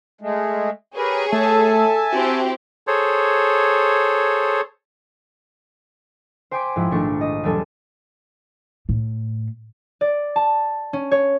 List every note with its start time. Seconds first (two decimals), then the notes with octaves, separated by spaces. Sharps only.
0.21 G#3 A3
0.97 G4 G#4 A#4 B4 C#5
1.32 A3 A4 E5 G#5 A5
2.13 C4 E4 F#4 G4
2.87 G#4 A4 C5 C#5
6.51 C5 G5 G#5 C6 D6 B6
6.76 G#2 F3 E4
6.91 A#1 G#2 D#3 A3 D4 C#6
7.21 D#5
7.44 E1 F#3 G3 A4 G#5
8.89 A2
10.01 D5
10.36 A5
10.93 C#4
11.11 C#5